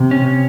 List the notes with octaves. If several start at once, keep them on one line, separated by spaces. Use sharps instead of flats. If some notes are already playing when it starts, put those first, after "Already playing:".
Already playing: C3
C#4